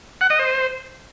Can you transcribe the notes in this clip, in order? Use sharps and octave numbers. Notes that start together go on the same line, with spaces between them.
F#5
D#5
C5